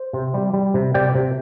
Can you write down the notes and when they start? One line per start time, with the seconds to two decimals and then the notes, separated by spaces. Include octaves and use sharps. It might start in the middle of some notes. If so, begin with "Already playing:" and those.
Already playing: C5
0.13 C3
0.34 G3
0.54 G3
0.74 C3
0.94 C3 D5 G5
1.15 C3